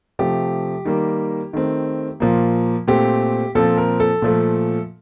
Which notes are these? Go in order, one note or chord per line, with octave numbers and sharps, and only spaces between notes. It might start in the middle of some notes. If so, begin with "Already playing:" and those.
C3 F3 A3 G4
D#3 G3 A#3
D#3 A3 C4
A#2 F3 A#3
A#2 A3 C4 G4
A#2 F3 C4 A4
A#4
A4
A#2 F3 A3